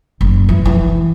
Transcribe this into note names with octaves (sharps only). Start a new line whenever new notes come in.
F#1
E3
E3